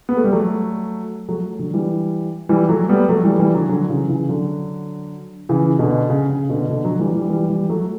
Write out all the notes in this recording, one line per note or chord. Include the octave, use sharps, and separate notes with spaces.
B3
A3
G3
F#3 A3
F#3 A3
D3 F#3
E3 G3
E3 G3
F#3 A3
G3 B3
F#3 A3
E3 G3
E3 G3
D3 F#3
D3 F#3
C#3 E3
C#3 E3
D3 F#3
C#3 E3
B2 D3
C#3
C#3
B2 D3
B2 D3
D3 F#3
E3 G3
E3 G3
E3 G3
E3 G3
F#3 A3